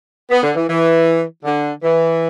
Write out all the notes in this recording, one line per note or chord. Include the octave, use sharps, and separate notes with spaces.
B3
D3
E3
E3
D3
E3